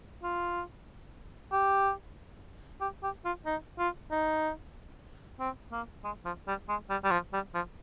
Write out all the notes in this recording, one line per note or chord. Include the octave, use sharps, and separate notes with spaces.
F4
G4
G4
G4
F4
D#4
F4
D#4
C4
A#3
G#3
F3
G3
G#3
G3
G3
F3
G3
F3